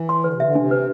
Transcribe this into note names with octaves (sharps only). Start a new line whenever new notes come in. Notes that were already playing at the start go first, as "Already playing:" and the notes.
Already playing: E3
C6
D3 B4
C3
D3 E5
C3 D4
B4